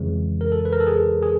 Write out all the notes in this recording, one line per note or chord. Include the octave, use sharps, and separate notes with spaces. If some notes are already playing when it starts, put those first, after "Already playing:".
Already playing: F2 C#3 E3 G#3
A#4
A4
B4
A#4
A4
G#4
G#4